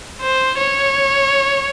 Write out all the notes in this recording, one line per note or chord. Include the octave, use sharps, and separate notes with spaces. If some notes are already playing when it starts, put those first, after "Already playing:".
C5
C#5